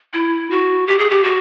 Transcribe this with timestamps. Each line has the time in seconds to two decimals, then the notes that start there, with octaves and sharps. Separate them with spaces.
0.14 E4
0.51 F#4
0.87 G4
0.99 G#4
1.10 G4
1.24 F#4